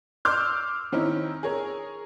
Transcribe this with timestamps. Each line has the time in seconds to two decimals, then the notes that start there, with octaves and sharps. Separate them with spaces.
0.25 C6 D6 E6 F6 G6
0.92 D#3 C4 C#4 D#4 E4
1.43 G#4 A#4 C#5